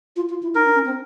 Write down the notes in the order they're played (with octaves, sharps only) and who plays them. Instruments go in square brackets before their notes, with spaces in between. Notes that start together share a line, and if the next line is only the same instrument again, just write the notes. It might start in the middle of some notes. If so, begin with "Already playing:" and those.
[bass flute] F4
F4
E4
[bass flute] D#4 [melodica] A#4
[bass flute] D4
C#4
C4